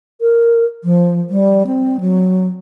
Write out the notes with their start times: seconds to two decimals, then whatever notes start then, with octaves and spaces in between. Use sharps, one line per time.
0.21 A#4
0.84 F3
1.30 G3
1.67 C4
2.00 F#3